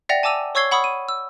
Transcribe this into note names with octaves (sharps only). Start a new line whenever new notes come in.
D5 E5 F#5 G5 A#6 F7
G#5 A5 D6 E6 D#7 F7
C#5 C#6 E6 G#6 C7 G7
F#5 B5 C#6 D#6 E6
D#7
E6